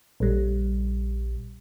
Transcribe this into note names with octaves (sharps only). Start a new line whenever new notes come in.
A#1 G3